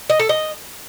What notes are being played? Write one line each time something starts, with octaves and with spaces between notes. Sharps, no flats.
D#5
A4
D#5